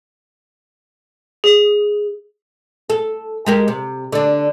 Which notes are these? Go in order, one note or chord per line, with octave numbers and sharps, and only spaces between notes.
G#4
A4
G#3 G4 A#4
C3
D3 D4